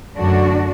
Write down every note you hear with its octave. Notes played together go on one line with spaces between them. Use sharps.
F#2 D3 A3 D4 F#4